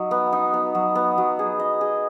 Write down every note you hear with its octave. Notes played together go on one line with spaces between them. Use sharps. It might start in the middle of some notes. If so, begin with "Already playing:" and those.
Already playing: F#3 D#4
B3
D#4
B3
F#3
B3
F#3
G#4
D#5
G#4